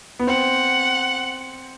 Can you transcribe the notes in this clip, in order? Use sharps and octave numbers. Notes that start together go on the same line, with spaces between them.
B3
C4 F#5